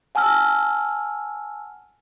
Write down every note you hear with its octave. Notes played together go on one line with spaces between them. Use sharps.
F#5 G#5 A5 E6 F6